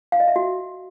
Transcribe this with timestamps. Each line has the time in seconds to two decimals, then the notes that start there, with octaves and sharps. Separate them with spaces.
0.12 F5
0.20 D#5
0.28 E5
0.36 F#4